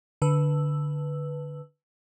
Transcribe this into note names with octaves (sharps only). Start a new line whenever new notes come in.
D3 B4 E6